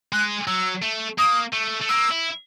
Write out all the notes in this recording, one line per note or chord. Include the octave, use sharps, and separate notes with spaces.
G#3 F#6
F#3 E6
A3
A#3 D#6
A3
A3
A#3 E6
E4